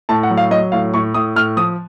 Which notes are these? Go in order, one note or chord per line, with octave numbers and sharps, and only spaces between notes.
A2 A5
F#5
F#3
F5
F#3 D#5
A2 F5
A2 C#6
A2 D#6
A2 F6
F3 D#6